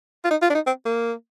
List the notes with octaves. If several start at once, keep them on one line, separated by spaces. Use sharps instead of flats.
F4
D#4
F4
D4
D#4
C4
A#3